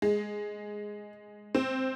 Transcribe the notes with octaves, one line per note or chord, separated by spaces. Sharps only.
G#3
C4